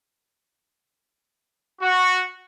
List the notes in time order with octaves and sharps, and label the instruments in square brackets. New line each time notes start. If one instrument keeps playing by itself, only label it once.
[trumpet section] F#4